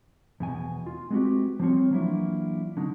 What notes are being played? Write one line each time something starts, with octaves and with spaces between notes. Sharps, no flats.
E2 B2 G#5
F4
G#3 B3 C4 D4 F#4 G4
F3 G3 C4 F4 C#5
E3 F#3 A#3 D4 E4 F4
D3 F#3 D#4